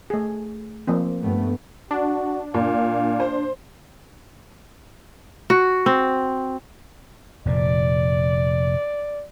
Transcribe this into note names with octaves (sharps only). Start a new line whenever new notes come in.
A3 G#4
F3 A#3 C4
G2 A3 B3
D4 F#4
A#2 F5
C5
F#4
C4
F1 A#2 D5